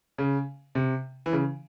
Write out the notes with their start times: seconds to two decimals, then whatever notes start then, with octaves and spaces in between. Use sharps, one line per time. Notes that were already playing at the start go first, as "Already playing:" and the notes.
0.18 C#3
0.75 C3
1.26 E3
1.33 C#3